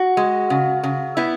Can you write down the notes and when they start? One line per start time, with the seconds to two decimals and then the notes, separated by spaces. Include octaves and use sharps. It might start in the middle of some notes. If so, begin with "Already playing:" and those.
Already playing: F#4
0.17 G#3
0.50 C#3
0.83 C#3
1.17 B3 E4